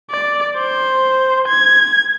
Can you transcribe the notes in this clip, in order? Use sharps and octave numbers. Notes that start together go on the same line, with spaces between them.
D5
C5
G#6